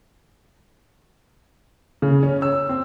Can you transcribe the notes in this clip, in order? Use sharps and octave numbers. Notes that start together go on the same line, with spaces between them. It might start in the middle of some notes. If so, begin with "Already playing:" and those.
C#3
C#4
E6
C4